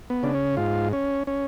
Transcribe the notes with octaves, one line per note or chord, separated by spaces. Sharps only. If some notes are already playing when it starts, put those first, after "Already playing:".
B3
C#3 D4
C#4
G#2 F4
C#4
C#4